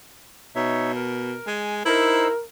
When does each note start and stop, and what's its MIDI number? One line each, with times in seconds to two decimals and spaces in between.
0.56 1.35 47
0.56 0.92 63
0.56 0.92 73
0.56 0.92 76
0.96 1.47 70
1.47 1.84 56
1.47 1.75 80
1.85 2.28 63
1.85 2.31 64
1.85 2.42 70
1.85 2.28 72
1.85 2.28 88